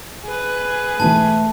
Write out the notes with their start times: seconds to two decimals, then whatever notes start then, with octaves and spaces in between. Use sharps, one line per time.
0.24 G#4 B4
1.00 G#2 B2 E3 A3 A5